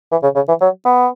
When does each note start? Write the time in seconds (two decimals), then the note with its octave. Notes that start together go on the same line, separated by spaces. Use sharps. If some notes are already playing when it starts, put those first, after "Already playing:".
0.12 E3
0.23 C#3
0.36 C#3
0.49 E3
0.61 F#3
0.85 B3